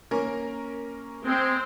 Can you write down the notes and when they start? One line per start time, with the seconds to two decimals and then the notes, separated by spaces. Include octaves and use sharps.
0.11 A#3 C#4 A#4
1.25 G#3 C4